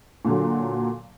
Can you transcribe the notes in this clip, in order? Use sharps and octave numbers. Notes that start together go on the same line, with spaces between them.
A#2 D3 F#3